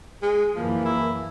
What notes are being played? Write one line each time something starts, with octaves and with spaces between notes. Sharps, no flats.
G#3 G#4
F#2 E3 F3 A#3
E4